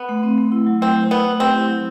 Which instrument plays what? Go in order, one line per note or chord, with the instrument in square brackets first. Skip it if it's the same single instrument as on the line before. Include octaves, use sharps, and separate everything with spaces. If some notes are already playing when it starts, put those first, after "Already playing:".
Already playing: [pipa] B3
[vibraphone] A3
C4
A3
E4
F#3
[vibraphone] A3 [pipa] C4
[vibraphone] A3
[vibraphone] A3 [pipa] B3
[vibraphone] A3
[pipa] C4 [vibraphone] G4
[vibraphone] E4
F#3